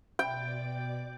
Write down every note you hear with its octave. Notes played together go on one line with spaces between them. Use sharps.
B2 D5 G5 D6